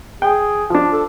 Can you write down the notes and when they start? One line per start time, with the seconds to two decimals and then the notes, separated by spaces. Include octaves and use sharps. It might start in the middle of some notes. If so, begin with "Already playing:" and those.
0.22 G#4 G5
0.70 F3 D4
0.92 A4